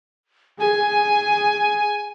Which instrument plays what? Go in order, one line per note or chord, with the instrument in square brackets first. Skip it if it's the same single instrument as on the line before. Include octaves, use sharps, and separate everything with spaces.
[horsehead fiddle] G#4 [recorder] G#5